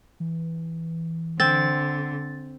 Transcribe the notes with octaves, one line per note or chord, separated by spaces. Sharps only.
E3
D3 C4 A6